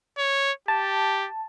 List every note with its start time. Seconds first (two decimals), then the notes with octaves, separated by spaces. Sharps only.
0.18 C#5
0.68 G4 A5